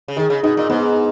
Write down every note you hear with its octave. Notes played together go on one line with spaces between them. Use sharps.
C#3
D#3 G#4
C#3
B2 D#4
A#2
G#2 B3